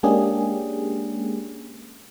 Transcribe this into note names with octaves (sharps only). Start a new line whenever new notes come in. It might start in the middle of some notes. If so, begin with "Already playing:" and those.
G#3 A#3 C#4 D4 G4 G#4